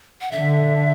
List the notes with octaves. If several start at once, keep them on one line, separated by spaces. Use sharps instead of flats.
F#5
D3 E5